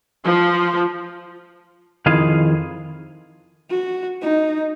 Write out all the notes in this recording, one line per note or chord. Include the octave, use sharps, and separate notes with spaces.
F3
F2 D#3 E4 F4 G#4 F5
F#4
D#4